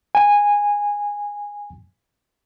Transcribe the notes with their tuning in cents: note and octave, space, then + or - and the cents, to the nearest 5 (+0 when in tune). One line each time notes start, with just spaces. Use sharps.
G#5 -15